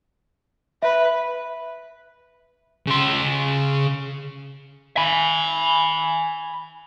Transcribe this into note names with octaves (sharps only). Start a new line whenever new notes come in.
B4 E5
C#3 C6
G#5 B5